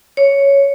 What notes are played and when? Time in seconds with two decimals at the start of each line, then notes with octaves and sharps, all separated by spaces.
0.17 C#5